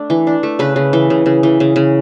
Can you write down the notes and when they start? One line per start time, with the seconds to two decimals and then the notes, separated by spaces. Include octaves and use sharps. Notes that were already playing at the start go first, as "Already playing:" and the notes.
Already playing: A3 D4
0.10 E3
0.27 D4
0.43 A3
0.59 C#3 B4
0.76 C#3
0.93 E3
1.10 C#3
1.26 C#3
1.43 E3
1.60 C#3
1.76 C#3